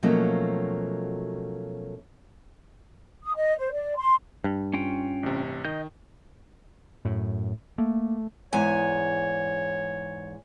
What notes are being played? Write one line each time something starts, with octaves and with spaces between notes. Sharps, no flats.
B2 F3 F#3 A3 A#3 C#4
D#6
D#5
C5
D5
C6
G2
C#4 F4 G5
A1 C3
D#3 D#5 G6
F#2 A2
A3 A#3
E2 G#2 C#5 G#5